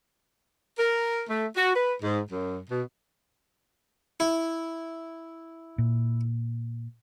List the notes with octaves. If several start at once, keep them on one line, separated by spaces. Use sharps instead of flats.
A#4
A3
F#4
B4
G#2
F#2
B2
E4
A#2